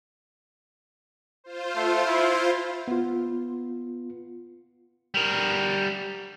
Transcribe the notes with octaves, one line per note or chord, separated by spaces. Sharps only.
F4 C5
A3
E4
B3 F4
G3 A#4